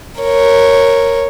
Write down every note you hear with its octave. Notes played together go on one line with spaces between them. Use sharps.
A#4 C#5